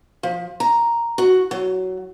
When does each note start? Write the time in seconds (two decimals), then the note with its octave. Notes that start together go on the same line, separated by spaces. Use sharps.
0.23 F3
0.60 A#5
1.18 F#4
1.51 F#3